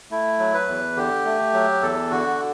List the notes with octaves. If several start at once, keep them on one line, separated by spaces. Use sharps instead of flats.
A3 E4
F#3
B4
E2
D3 G4
A3
F#3
E2 A4
D3 F#4